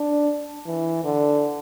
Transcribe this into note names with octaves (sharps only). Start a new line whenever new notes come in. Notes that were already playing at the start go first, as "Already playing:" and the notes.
Already playing: D4
E3
D3